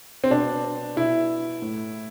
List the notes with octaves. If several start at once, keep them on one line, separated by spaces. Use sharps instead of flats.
C4
B2 D4
B2 E4
A2